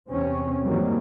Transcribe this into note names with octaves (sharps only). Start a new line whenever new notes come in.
E2 C3 C4 C#4
G#2 D#3 E3 F#3 G3 A#3